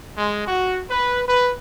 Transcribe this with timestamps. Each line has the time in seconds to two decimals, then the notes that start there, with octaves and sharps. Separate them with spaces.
0.18 G#3
0.48 F#4
0.90 B4
1.28 B4